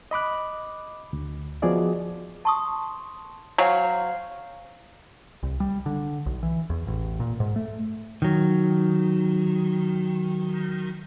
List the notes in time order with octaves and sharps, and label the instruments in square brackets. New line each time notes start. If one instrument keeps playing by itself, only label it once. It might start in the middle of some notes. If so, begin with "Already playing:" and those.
[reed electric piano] D#5 B5 D6 F#6
D2
F3 B3 F#4 G#4 D5 D#5
[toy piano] A5 C#6 D#6 [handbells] C6
[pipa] F#3 [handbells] C5 F5 [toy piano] G#5
[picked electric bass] C2
G3
D3
B1
E3
E2
A1
A#2
G#2
A3
[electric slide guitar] D#3 F#3